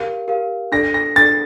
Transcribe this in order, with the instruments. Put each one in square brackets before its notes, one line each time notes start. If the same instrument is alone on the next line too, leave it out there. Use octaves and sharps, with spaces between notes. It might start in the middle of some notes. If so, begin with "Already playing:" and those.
Already playing: [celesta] G4 A#4 F5
G4 A#4 F5
[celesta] D4 A4 D5 [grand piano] A#6
[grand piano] A#6
[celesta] D4 A4 D5 [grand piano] A6